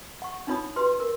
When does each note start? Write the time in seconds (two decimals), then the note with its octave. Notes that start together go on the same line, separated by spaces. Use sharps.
0.22 F#5 C#6
0.47 D4 D#4 F4 C#5 B5 D#6
0.76 G4 B4 C6
1.00 A#4